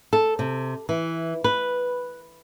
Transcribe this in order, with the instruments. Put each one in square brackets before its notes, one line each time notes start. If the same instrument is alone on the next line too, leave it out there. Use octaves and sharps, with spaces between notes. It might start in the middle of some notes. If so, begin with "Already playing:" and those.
[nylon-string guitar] A4
C3
E3
B4